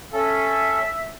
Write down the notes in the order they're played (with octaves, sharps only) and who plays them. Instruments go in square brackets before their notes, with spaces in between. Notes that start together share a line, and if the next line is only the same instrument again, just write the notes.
[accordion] C#4 A4 [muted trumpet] E5